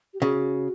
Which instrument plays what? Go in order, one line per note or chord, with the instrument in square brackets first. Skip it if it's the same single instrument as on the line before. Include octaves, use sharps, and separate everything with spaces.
[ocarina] G4
[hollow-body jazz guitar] C#3 [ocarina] F#4